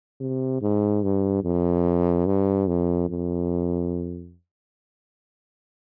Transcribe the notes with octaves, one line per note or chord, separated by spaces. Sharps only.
C3
G#2
G2
F2
G2
F2
F2